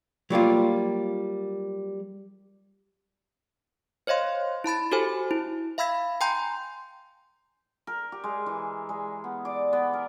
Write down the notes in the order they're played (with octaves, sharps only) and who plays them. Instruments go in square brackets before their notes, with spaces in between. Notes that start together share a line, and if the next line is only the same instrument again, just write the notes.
[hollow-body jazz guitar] F#3 G3 A#3 F4
[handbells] C5 C#5 D#5 F5 C6
E4 A5 B5 A6
F#4 G4 A4 C5 G#5
E4
E5 F5 B5 E6 G#6 B6
G5 G#5 A#5 C6 G6
[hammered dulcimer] A#4
G4
G#3
E3
G#3
B3
D5
B3
A#4